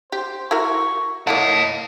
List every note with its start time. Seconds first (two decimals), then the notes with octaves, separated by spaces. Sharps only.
0.12 G4 C5
0.51 E4 F#4 A#4 C#6
1.27 A#3 E4 C#5 D#5 F#5 A5